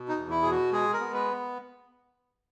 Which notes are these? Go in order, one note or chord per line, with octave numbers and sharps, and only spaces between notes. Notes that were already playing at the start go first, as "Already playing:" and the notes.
Already playing: B2
D#4
E2
E4
B2 G#4
F#4
G#3 G#4
A#4
B3
B4